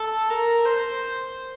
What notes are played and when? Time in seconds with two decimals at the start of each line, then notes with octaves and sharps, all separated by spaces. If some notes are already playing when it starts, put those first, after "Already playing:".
Already playing: A4
0.30 A#4
0.66 C5